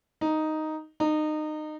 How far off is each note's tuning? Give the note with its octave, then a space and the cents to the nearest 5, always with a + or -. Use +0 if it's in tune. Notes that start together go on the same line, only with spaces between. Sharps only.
D#4 +0
D#4 -25